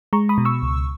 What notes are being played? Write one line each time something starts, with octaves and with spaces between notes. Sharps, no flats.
G#3 A#5 C#6
B5 D#6
B2
C#6 E6
C#2